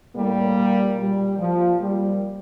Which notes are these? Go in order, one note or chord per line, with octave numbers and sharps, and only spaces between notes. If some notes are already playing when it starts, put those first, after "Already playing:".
A2 G3 A#3
A#2
A#2 G3
A#2 F3
A#2 G3